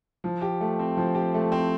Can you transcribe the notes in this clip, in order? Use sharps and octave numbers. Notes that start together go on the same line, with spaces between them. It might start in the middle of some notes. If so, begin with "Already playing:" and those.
F3
G4
A3
C4
F3
G4
A3
C4